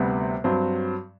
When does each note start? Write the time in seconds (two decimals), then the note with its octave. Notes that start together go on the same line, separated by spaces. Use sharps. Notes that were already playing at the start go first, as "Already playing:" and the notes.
Already playing: D2 C3 G3 B3
0.44 G2 F#3 C4